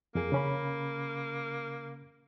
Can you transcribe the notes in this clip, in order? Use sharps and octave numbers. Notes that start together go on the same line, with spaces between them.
F2 A#3 G#4
C#3 C#4 B5